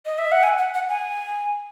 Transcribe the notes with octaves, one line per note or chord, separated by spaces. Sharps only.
D#5
E5
F#5
G#5
F#5
F#5
G#5